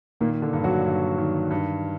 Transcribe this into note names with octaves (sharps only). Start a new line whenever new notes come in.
A#2 D#3 A#3
D3 D4
G2
F#3 F#4
G2
D#3
G2